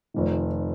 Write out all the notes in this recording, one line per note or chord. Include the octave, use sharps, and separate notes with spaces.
F1 F2 D#3